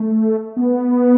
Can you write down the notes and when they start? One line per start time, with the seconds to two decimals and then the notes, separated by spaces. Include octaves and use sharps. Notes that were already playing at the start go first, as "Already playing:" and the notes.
Already playing: A3
0.57 B3